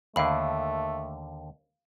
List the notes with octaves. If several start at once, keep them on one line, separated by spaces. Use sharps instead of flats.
D#2 D3 A3 F5 B5